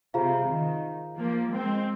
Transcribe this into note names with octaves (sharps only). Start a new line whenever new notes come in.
C3 F4 G#4 C5 F5 A#5
D#3
F3 A#3
G#3 C4